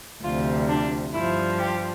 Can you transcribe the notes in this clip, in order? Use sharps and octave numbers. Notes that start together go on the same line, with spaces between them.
D2 C3 F3 F4
D4
G2 F3 E4
G4